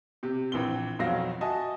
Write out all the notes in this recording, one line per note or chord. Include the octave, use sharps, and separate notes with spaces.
C3 G4
A#1 E3 C4 G7
B1 F2 F#3 C4 F5 A#6
F#4 D#5 E5 G#5 A5